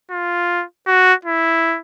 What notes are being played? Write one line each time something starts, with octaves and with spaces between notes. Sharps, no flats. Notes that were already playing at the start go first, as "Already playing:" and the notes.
F4
F#4
E4